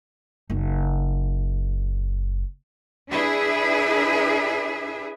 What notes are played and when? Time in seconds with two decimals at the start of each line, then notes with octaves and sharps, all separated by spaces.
0.50 F#1 D#4
3.11 D4 E4 G#4 B4 E5